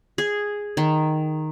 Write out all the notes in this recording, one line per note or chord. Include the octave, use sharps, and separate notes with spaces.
G#4
D#3